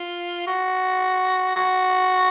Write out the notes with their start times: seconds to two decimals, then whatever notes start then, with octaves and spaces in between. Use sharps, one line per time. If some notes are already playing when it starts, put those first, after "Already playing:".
Already playing: F4
0.47 F#4
1.56 F#4